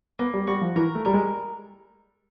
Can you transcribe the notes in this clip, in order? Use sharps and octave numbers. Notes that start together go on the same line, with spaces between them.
A#3 B3
G3
G3 F#4
F3
E3 A#4
A3
G3 A#4
G#3